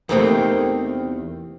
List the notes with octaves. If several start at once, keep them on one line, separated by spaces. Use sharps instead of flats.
E2 C3 D#3 A3 A#3 C4